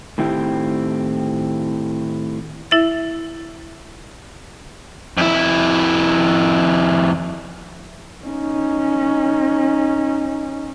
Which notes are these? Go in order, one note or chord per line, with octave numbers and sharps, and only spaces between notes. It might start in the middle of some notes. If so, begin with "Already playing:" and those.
A2 D#3 C4 E4 G4
E4 E5 A6
F2 E4
C#4 D#4